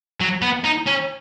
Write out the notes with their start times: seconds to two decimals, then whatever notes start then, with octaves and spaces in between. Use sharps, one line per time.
0.21 F#3
0.42 B3
0.64 D#4
0.87 C#4